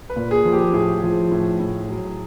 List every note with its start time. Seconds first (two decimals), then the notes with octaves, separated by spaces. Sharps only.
0.10 B4
0.16 A#2
0.31 G#4
0.45 F3
0.53 G4
0.73 A2 G#4
1.03 F3
1.31 A2
1.60 A2
1.89 F#3